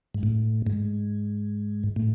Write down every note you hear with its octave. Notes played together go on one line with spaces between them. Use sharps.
G#2
A2
G#2
A2